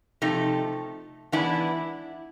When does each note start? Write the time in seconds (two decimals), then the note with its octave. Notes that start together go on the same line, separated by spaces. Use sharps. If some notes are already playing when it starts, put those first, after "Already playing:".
0.22 C3 F3 A3 D#4
1.32 E3 G#3 B3 D4 E4